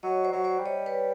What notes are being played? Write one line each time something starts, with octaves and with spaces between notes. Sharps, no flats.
F#3 C#5 D#5
C5 D5
F#3
C5 D5
G3
C#5 D#5
B4 C#5